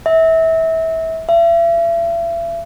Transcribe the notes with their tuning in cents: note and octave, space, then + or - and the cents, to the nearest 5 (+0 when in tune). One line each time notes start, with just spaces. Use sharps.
E5 -25
E5 +40